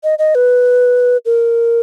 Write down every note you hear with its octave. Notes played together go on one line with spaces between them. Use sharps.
D#5
D#5
B4
A#4